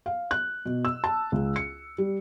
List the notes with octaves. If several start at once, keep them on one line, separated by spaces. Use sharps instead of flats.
F5
F#6
B2
E6
A5
C#2
C#7
G3